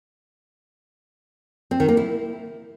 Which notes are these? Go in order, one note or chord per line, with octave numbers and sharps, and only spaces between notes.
C4
D#3
A#3
E4